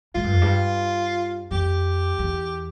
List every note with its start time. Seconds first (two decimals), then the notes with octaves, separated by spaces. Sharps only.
0.15 G#2 F4
0.24 G2
0.33 F2
0.42 G2
1.51 F2 G4
2.19 E2